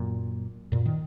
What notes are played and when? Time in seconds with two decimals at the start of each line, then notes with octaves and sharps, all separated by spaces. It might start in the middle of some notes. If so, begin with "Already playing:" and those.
Already playing: F#2 A#2
0.72 F#2 A#2
0.86 D#3